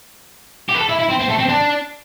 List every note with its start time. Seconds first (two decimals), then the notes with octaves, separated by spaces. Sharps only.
0.69 G4
0.75 B4
0.79 A4
0.89 E4
0.99 E4
1.09 C4
1.19 C4
1.29 A3
1.38 C4
1.48 D4